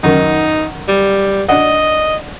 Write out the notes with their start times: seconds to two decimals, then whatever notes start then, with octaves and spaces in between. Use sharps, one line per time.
0.03 F#2 D#3 D#4
0.88 G3
1.48 D4 D5 D#5 F#5